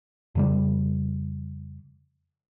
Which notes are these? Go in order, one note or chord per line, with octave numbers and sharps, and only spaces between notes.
F2 C#3 G3